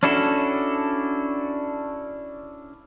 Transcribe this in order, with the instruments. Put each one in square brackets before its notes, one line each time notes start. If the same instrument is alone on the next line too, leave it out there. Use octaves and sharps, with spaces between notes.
[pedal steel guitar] C#4 D4 E4 F#4 A4